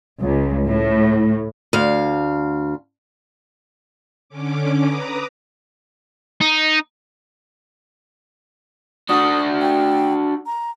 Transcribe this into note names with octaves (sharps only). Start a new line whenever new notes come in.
C#2
A2
D2 F5
D3 C#4 D6
B4 A#5 D6 D#6
D#4
D4 F#4 D#6
G5
A#5